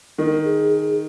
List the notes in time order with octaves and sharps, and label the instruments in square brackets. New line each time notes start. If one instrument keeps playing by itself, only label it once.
[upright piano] D#3 [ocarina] A#4
[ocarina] G#4
G#4